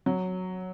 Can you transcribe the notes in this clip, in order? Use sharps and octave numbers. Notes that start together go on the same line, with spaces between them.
F#3